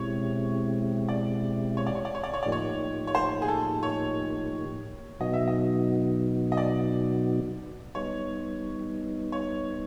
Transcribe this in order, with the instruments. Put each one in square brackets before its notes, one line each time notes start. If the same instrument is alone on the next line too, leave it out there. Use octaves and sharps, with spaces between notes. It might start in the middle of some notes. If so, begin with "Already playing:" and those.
Already playing: [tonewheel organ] B2 G#3 C4 E4 G4 [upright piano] C#5
[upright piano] D5
C#5
D5
C#5
D5
C#5
D5
C#5
[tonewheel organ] A2 F3 A#3 D#4 G4 [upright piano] D5
[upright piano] C#5
C#5
C5
G#4
A4
C#5
[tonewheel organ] B2 F#3 B3 D#4 F#4 [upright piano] D#5
[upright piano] E5
D#5
D#5
D5
[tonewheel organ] G3 B3 D#4 [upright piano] C#5
[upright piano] C#5